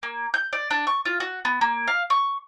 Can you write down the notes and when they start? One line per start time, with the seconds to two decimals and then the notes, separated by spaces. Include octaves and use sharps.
0.03 A#3
0.34 G6
0.53 D5
0.70 D4
0.87 C#6
1.05 F4
1.20 F#4
1.45 B3
1.61 A#3
1.87 F5
2.10 C#6